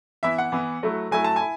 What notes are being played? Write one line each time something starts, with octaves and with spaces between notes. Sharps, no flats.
E3 B3 E4 E5
F#5
E3 B3 E4
F#3 A3 E4
F#3 A3 E4 G#5
A5
E4 G#5